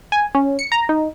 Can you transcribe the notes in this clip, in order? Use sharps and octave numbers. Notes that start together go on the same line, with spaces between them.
G#5
C#4
C#7
A#5
D#4